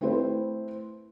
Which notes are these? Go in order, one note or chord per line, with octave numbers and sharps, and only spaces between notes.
A3 C4 E4 B4 C5